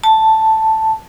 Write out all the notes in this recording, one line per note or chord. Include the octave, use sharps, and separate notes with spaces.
A5